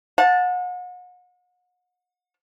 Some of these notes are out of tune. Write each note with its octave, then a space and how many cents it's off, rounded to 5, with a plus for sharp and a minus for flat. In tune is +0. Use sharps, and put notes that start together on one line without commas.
F#5 -40 A5 +0